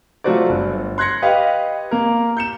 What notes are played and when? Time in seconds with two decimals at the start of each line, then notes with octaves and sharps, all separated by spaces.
0.24 F#3 A3 F4 F#4 C5 D5
0.49 G1
0.98 C6 F#6 G#6 A#6 C#7
1.22 G4 B4 D#5 F5
1.91 A#3 A#4
2.37 G6 C#7 E7